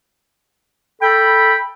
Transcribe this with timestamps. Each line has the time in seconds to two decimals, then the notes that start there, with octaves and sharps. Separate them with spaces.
1.02 A4 G5 B5